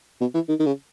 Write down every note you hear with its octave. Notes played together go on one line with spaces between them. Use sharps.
B2
E3
D#3
D#3
C#3